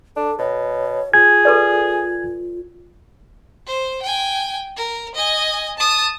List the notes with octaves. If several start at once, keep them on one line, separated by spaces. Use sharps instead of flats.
D4 A4
B2 C#5
F4 G#4 G#6
A4 B4 D5
C5
G5 G#5
A#4
D#5 G#5
A5 D#6